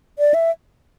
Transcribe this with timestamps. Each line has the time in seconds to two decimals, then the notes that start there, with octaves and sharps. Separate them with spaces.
0.19 D5
0.34 E5